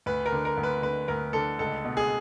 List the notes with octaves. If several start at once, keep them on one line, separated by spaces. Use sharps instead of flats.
D2 B4
A#4
D3
A#4
D2
B4
D3 B4
D2 A#4
D3 A4
C#2 A4
B2
G#4